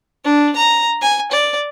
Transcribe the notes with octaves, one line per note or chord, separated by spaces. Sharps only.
D4
A#5
G#5
D5